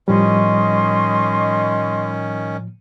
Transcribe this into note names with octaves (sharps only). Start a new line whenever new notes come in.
A2 D#3 F3 G3 C#4 D#5 C6 C#6